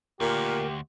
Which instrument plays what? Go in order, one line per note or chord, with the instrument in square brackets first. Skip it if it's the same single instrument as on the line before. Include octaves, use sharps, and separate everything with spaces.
[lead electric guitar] D2 [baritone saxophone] A#2 [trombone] G4 [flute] A#4